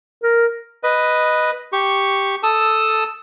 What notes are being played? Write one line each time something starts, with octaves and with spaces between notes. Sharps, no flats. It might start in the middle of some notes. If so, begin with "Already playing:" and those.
A#4
B4 D#5
G4 C#6
A4 A5 D#6 E6